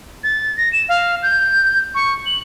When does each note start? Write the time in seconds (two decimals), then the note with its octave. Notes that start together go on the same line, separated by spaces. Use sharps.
0.24 A6
0.57 A#6
0.73 E7
0.89 F5
1.23 G6
1.95 C#6
2.26 F#7